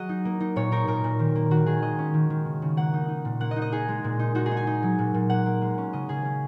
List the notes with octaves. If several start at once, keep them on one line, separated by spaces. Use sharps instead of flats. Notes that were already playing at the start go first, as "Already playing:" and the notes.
Already playing: F#3 G#4 D#5 F#5
D#4
A#3
D#4
A#2 C#5
D#4 A#4
A#2 A#4
A#2
D#3
A#3
D#3 F#4
D#3 G#4
G#3 D#5
C#4
D#3
D#3
C#3
C#3
A#3 F#5
D#4
D#4
A#2
A#3 F#5
D#5
D#4
D#5
D#4 G#4
G#3
A#2
D#4
D#4 F#4
G#4
D#4
G#5
D#4
F#3
A#2
A#2
A#3 F#5
A#3
G#3
C#4
C#3 D#5
C#3 G#4
C#4